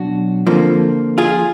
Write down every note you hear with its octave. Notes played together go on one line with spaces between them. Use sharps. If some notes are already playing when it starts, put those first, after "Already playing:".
Already playing: B2 F#3 D4 F#4
F2 D3 F3 A#3
F4 G#4